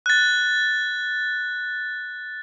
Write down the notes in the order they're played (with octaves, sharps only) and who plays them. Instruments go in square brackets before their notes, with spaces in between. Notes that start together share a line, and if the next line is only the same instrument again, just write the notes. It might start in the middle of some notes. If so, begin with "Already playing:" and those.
[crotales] F#6 A6